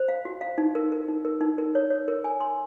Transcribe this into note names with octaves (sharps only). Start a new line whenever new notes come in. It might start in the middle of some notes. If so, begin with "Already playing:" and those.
Already playing: C5
F5
F#4
F5
D#4
A#4
A#4
D#4
A#4
D#4
A#4
C#5
C#5
A#4
G#5
C6